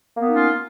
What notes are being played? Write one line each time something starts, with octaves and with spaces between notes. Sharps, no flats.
A#3 B3 C#4 D#4 F4